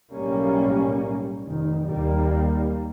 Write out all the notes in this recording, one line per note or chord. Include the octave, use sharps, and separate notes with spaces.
B1 A2 G3 A#3 C#4
F1 D#3
D#2 G3 A#3